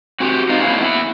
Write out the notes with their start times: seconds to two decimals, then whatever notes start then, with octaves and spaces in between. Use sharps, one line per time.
0.20 C4 F#4 G4
0.49 C4 D#4 F4
0.61 A#3 C#4 D4 E4 B4 F5
0.80 B3 E4